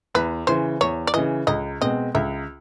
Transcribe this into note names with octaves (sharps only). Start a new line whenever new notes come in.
E2 B4
C#3 E3 C5
E2 C#5
D5
C#3 E3 D#5
C#2 D#5
B2 G#3 C4 D#5
C#2 E5